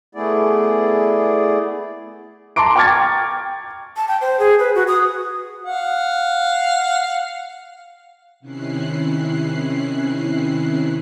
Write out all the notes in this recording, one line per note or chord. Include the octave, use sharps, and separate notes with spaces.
A3 B3 E4 G#4 D5
A5 A#5 C6 D6 D7
G5 C#6 D6 F6 G#6 A6
A5
G5
C5
G#4
B4
F#4
D#6
F5 F#5
C3 D#3 C#4 E4 F#6 C7